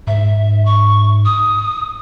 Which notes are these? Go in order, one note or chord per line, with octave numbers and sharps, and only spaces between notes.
G#2 E5
C#6
D#6